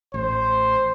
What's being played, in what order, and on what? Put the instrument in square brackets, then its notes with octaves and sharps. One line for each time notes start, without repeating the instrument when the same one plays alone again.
[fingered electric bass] A1 [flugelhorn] C5